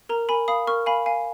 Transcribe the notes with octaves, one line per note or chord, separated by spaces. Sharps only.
A#4 A#5
A#4 G#5 B5
F5 B5 D#6
A#4 C#6 F6
F5 G#5 B5
F5 G#5